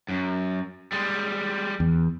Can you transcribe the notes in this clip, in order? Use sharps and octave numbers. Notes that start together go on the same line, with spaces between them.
F#2
G3 G#3
E2